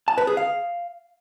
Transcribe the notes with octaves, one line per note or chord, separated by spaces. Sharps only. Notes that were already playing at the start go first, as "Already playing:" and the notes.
A5
B4
G#4
F5